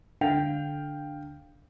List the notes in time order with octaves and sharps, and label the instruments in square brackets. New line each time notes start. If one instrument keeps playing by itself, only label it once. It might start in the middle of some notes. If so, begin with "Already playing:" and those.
[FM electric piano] D3 [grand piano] F5 G5 F7